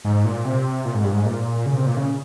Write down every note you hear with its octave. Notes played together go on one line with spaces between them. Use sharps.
G#2
A#2
C3
A#2
G#2
G2
G#2
A#2
C#3
C3
A#2
C#3